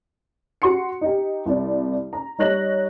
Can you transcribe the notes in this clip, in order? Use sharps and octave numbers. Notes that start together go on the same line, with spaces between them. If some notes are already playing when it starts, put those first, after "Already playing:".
F#4 C6 C#7
D#4 G4
C2 D5
A#5
G3 D#4 C#5 F#6 A#6 F#7